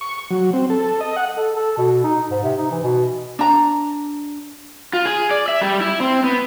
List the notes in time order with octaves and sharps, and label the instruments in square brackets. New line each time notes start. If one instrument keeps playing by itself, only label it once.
[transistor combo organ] C#6
F#3
C4
A4
D#5
F#5
[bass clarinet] A4
A4
B2
D#4
G#2
C3
D#4
E3
B2
[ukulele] D4 A#5
[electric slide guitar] F4
G#4
D5
E5
G3
E4
C4
B3